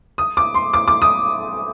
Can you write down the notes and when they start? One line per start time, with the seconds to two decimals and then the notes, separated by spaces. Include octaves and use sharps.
0.18 D#6
0.37 D6
0.54 C6
0.74 D6
0.88 D6
1.02 D#6